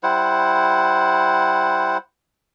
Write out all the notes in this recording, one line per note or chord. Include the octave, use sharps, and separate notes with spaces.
G3 E4 C5 F#5